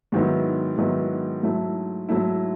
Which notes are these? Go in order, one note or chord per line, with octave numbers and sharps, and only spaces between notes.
G#2 D#3 F#3 B3 E4
G#2 D#3 F#3 B3 E4
G#2 F#3 A3 E4
G#2 F#3 A3 E4